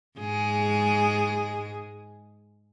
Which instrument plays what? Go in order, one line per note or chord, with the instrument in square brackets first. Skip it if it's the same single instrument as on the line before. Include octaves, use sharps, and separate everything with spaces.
[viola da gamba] G#2 G#3 G#4